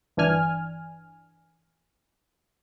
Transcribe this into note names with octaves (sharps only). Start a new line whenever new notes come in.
G1 E3 D4 G#5 F6